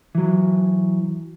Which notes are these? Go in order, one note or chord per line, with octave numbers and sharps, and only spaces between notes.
E3 F#3